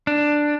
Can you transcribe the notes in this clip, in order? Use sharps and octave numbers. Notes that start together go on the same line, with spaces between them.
D4